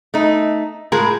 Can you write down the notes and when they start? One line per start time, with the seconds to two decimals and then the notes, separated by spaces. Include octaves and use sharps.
0.14 A3 D#4
0.92 A2 G#3 F4 G#4 A#4